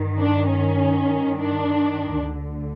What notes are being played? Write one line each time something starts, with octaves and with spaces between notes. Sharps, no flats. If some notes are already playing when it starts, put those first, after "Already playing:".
Already playing: G2 D#3
D4
C#4
D4
D2 D3